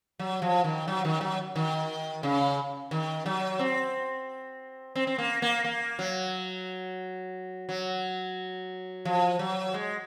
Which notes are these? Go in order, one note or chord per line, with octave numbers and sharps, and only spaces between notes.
F#3
F3
D#3
F#3
D#3
F#3
D#3
C#3
D#3
F#3
C4
C4
C4
A#3
A#3
A#3
F#3
F#3
F3
F#3
G#3